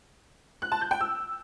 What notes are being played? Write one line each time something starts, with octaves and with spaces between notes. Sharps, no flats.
F#6
A5
G6
G5
E6